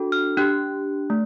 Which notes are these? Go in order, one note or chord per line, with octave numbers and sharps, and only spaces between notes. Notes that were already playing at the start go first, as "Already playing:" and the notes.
Already playing: D4 F#4 A4
F6
D4 G4 F#6
A3